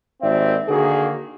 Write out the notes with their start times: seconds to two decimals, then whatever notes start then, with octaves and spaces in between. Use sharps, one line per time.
0.22 G#1 D#2 C4 D5 E5
0.68 D3 D#3 A#3 F#4 G#4